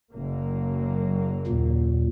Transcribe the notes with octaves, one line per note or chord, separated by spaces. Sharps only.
F#1 F#3 A#3
D#2 A#2